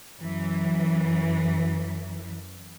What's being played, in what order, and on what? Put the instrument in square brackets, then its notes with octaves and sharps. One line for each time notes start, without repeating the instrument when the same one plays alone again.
[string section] F#2 E3